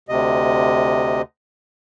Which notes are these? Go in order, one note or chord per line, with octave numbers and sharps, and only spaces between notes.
D2 C3 D#5